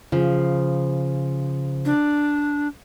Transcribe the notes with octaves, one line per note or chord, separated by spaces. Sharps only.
C#3 F3
D4